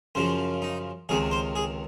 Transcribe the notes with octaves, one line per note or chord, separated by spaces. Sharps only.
F#2 C#3 F3 C5
D#4
C#2 C3 D#3 G#4
C5
G#4